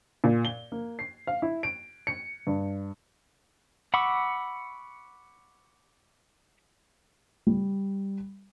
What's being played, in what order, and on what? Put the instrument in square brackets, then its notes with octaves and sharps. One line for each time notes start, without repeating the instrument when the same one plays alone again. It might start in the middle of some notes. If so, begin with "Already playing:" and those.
[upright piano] A#2
G7
A#3
C7
F5
E4
D7
C#7
G2
[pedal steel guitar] F#5 B5 C#6 D6 E6
[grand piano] G3